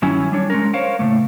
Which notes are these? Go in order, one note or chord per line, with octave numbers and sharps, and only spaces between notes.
G2 D#3 F#3 C#4 E4 G#5
G3 D4 C#5
G#3 C#4 A#4
A#4 C5 C#5 F5
A2 C#3 A3 A#3